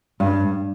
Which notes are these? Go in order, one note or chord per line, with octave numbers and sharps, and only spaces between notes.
G2